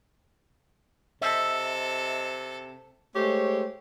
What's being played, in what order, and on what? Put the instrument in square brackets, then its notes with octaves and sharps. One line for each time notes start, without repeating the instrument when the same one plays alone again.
[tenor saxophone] C3 [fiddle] A4 [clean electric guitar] C5 D#5 E5
[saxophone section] G#3 A3 G4 C5 C#5